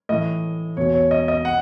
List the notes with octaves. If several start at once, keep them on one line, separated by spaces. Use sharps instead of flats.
A2 E3 D#5
E2 B2 C#5
C#5
D#5
D#5
F#5